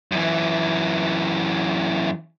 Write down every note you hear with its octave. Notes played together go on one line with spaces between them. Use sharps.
F#2 E3